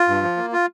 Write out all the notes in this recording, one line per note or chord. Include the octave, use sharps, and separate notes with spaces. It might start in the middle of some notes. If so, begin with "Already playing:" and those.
Already playing: F4
G2
F3
A#3
F4